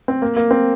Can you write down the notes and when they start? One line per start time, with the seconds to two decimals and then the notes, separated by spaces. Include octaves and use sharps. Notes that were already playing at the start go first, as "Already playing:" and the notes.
0.08 C4
0.22 A#3
0.36 A#3
0.51 C4